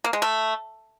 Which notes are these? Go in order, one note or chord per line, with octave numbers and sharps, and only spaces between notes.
A#3
G#3
A3